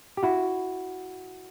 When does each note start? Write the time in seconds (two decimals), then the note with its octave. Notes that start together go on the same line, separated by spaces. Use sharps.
0.17 G4
0.23 E4 F#4